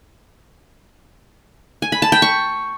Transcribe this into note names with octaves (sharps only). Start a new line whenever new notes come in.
G#5
B5
A5
G5
C#6